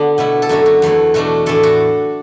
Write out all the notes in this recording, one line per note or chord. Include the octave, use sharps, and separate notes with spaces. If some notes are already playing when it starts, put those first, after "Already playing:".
Already playing: D3 B3 D4 F#4
B2 A3 E4
A4
F#2 D3 A3 F#4
F#4
E2 E3 A3
B2 A3 D4 F#4
A2 E3 D4 A4
F#4